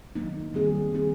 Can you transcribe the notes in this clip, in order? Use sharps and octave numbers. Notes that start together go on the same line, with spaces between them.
D#3 F#3 A#3 D#4
D#3 G3 C4 D#4 G#4
D#3 G3 C4 D#4 G#4